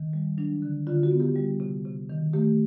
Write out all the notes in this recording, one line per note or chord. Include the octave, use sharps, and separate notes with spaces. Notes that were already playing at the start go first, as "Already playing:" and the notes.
Already playing: D#3
G3
F#3 D4
D3
D3 F4
F#4
B3
G4
G3
C3
C3
D#3
A3 G4